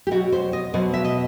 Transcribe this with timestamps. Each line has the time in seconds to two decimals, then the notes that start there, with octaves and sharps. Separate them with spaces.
0.07 G4
0.11 B2 F#3 F#4
0.32 C5
0.53 D#5
0.74 B2 F#3 C5
0.94 E5
1.05 D#5